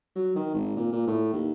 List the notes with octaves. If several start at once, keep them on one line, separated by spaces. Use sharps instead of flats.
F#3
D#3
G#1
A#2
A#2
A2
D#2